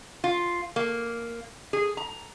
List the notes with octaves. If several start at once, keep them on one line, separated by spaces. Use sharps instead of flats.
F4
A#3
G#4
A#5